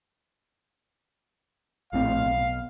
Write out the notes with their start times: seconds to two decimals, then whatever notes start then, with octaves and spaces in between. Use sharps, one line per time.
1.93 A#1 A2 C4 F5
2.25 B1